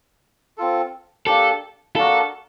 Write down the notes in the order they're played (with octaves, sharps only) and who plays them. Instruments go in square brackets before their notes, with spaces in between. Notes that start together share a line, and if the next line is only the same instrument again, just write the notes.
[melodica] C4 F4 A4
[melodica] A#3 D4 G4 [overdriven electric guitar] A4
[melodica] A#3 D4 F#4 A#4 [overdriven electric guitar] A4